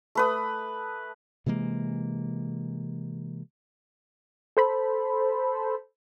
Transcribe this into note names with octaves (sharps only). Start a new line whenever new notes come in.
A3 B4 D#6
C3 E3 G#3 A#3
A4 C5 B5